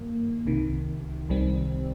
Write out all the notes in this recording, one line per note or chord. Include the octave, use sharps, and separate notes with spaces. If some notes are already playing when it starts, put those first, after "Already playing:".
Already playing: G2 D#3 A#3
C2 C3 D#3
C2 C3 D#3 G3 C4